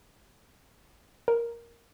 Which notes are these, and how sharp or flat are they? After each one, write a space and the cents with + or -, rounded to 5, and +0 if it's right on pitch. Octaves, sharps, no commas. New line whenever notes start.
A#4 +5